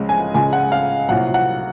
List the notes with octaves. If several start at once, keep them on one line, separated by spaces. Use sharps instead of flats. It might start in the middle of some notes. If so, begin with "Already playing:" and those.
Already playing: C#2 C#3 F3 G#3
G#5
C#2 C#3 G#3 G#5
F#5
F5
C2 A#2 F#3 F#5
F#5